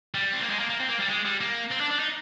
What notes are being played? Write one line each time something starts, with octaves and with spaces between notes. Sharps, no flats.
G3
C4
A#3
G#3
A#3
A#3
C4
A#3
G3
G#3
G3
A#3
C4
D4
D4
D#4